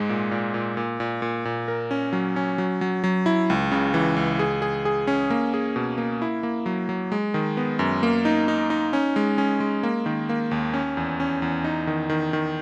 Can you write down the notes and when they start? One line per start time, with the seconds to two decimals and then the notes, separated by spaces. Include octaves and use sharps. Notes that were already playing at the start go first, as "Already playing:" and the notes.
Already playing: G#2 G#3
0.09 A#2
0.31 A#2
0.54 A#2
0.77 A#2
1.00 A#2
1.22 A#2
1.45 A#2
1.68 A#4
1.91 C#4
2.13 F#3
2.36 C#4
2.58 F#3
2.81 F#3
3.04 F#3
3.26 E4
3.50 C#2
3.71 C#3
3.94 E3
4.16 C#2
4.39 G#4
4.62 G#4
4.85 G#4
5.07 C#4
5.30 A#3
5.54 G#4
5.76 B2
5.98 A#3
6.22 E4
6.43 A#3
6.66 F#3
6.89 F#3
7.12 G#3
7.34 D#3
7.57 B3
7.79 F#2
8.03 A#3
8.25 D#4
8.48 D#4
8.70 D#4
8.93 C#4
9.16 G#3
9.38 C#4
9.60 G#3
9.83 A#3
10.06 D#3
10.29 A#3
10.51 D#2
10.74 C#4
10.97 E2
11.20 C#4
11.42 E2
11.64 D#4
11.87 D#3
12.09 D#3
12.33 D#3